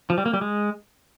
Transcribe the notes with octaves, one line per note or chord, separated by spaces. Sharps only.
F3
G3
A#3
G3
G#3